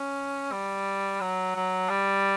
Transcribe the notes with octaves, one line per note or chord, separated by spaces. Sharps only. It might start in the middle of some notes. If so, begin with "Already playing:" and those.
Already playing: C#4
G3
F#3
F#3
G3